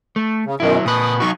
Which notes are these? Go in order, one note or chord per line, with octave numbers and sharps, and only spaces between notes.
A3
C#3
F#2 B2 D#3 F#3 E4
A#2 B4 D#6
F#3 D#4 F#4 C#6